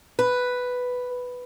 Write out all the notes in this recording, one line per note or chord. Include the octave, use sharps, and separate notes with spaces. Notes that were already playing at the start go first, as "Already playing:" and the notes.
B4